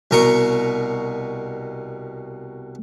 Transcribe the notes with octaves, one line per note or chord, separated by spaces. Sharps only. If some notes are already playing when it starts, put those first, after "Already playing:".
C2 B2 A#4 A#5 C#6